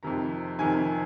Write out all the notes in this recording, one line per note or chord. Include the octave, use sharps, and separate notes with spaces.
F2 C3 D#3 A#5
F2 C3 D#3 G#5